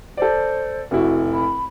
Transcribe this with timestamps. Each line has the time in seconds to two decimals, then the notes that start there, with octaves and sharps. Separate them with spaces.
0.17 A4 C5 D5
0.91 F1 E4 F#4
1.33 B5